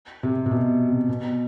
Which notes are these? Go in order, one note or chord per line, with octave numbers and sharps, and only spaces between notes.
C3
C3
B2
C3
B2